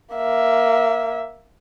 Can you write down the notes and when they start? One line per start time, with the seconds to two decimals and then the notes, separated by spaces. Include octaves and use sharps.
0.14 A#3 E5